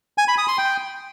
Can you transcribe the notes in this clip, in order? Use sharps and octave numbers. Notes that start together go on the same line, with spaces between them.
G#5
B5
D#6
C6
G5